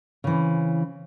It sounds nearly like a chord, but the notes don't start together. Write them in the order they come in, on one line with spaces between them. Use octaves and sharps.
C#3 E3 C4